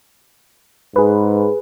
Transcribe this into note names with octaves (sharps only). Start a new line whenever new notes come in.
G#2 G#4 B4